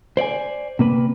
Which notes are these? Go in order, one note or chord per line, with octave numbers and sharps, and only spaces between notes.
C5 D5 E5 G#5
C3 A#3 B4